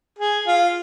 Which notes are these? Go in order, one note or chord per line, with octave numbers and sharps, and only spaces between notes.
G#4
F4